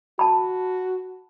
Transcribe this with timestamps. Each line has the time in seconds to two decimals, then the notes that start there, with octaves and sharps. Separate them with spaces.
0.19 F#4 A5 B5